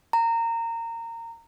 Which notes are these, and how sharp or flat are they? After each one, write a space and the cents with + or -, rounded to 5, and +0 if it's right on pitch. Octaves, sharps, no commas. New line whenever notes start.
A#5 -20